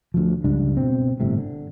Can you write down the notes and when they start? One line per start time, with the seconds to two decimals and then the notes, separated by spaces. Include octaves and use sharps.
0.14 D2 F3
0.44 C#2 G2 D4
0.77 B2 C4
1.20 G1 A2 C3
1.38 D3